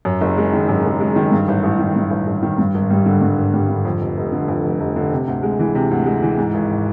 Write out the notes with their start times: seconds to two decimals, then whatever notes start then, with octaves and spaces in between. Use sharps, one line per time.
0.05 F#2
0.21 F#1
0.38 G#3
0.53 D#3
0.69 F#2
0.85 F#1
1.00 G#3
1.16 D#3
1.32 G2
1.48 A1
1.63 A1
1.79 D#3
1.96 G2
2.11 A1
2.27 A1
2.43 D#3
2.58 G2
2.74 G#1
2.90 G3
3.06 D3
3.21 G2
3.37 G#1
3.54 G3
3.69 D3
3.85 F2
4.01 F1
4.17 F1
4.32 D3
4.48 F2
4.64 F1
4.80 F1
4.96 D3
5.12 C3
5.28 D2
5.43 G#3
5.59 E3
5.75 C3
5.91 D2
6.06 G#3
6.22 E3
6.38 G#2
6.54 G#1